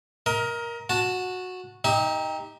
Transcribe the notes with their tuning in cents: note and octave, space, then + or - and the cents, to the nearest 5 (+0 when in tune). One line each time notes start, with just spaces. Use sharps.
A#4 +10 D#5 +35
F#4 -15 A5 +0
D#4 +0 G4 +20 E5 -40